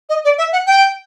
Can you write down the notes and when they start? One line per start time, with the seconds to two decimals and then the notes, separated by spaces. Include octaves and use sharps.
0.09 D#5
0.24 D5
0.38 E5
0.52 F#5
0.66 G5